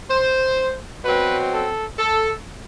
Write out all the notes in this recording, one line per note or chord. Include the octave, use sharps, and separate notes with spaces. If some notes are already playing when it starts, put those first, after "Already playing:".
C5
B2 F#3 C4 B4
A4
A4